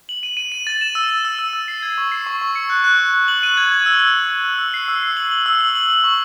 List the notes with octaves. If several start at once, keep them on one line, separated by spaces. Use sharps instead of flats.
F#7
D#7
D#7
D#7
A6
E7
E6
E6
E6
E6
E6
C7
G#6
C#6
C7
C#6
C#6
C#7
F#6
F#6
F#6
F#6
F#7
D#7
G#6
G#6
E6
G#6
E6
G#6
E6
E6
C7
E6
C7
F#7
F#7
E6
F#7
F#7
F#7
C#6